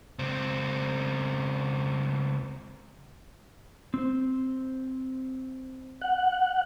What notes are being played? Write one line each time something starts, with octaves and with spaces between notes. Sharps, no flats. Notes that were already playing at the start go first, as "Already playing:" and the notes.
C#2 C4
C4 C5
F#5